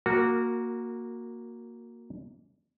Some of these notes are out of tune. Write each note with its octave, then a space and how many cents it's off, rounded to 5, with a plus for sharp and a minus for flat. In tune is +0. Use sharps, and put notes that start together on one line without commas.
A#3 +0 F#4 -15 A#4 -20